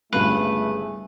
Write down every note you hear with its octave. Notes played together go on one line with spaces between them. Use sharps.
G1 C#2 G2 A3 E4 G#4 B4